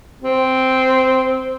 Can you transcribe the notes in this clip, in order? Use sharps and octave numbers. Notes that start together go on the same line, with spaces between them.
C4